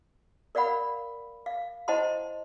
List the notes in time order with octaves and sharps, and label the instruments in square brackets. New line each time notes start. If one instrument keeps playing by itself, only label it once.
[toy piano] A#4 D5 F5 F#5 B5
F5
E4 C5 D#5 F#5 A5 C6